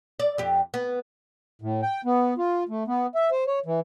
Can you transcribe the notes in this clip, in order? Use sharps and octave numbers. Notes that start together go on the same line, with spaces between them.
D5
F2 G4
B3
A2
G5
B3
F4
A3
B3
E5
C5
C#5
E3